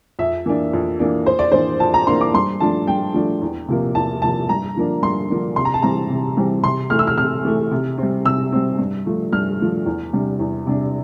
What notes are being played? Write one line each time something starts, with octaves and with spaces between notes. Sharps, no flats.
F2 E5
E3 A#3 D4
F2
E3 A#3 D4
F2 C5
D5
E3 A#3 D4 C5
F2 A5
A#5
E3 A#3 D4 C6
D6
G2 C6
F3 A3 D4 A5
G2 G5
F3 A3 D4
E2
C3 F3 A#3
E2 A5
C3 F3 A#3 A5
G2 A#5
D3 F3 A#3 D4
G2 C6
D3 F3 A#3 D4
C3 C6
A#5
A5
E3 G3 C4 A#5
C3
E3 G3 C4
C3 C6
E3 A3 F6
E6
F6
C3 F6
E3 A3
C3
G3 C4
C3 E6
G3 C4
G2
F3 A3
G2 F6
F3 A3
E2
C3 G3 D4
E2
C3 G3 D4